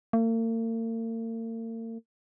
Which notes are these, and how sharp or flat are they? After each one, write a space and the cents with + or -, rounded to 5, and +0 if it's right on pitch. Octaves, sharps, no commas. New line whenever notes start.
A#3 -45